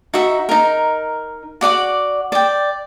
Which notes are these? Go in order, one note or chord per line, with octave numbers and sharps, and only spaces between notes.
D#4 F#4 E5
D#4 A#4
F#4 D5 F#5 D6
D5 G5